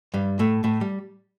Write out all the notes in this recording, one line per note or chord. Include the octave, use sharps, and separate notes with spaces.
G2 G3
A2 A3
A2 A3
G3